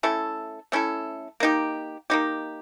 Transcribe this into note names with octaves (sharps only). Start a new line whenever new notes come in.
A3 C#4 E4 A4
A3 C#4 E4 A4
A#3 D#4 G4
A#3 D#4 G4